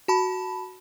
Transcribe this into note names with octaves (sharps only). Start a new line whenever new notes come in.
F#4 A5 B5